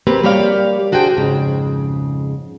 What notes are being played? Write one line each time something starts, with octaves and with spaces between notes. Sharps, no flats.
A#3 C4 G4 B4
G3 A#3 G4 C#5 D5 F5
D4 F#4 G#4 C5 G5
F2 G#2 C#3